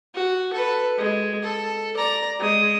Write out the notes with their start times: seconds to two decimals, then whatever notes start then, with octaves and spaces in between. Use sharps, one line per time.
0.14 F#4
0.53 A4 B4
0.98 G#3
1.42 A4
1.97 D5 A#5
2.39 G#3 D#6